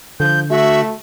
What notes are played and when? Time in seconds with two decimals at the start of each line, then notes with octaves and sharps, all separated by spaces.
0.20 D3 F3 G6
0.50 A3 F#4 E5